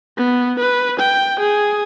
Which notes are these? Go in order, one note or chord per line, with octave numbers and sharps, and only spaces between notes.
B3
B4
G5
G#4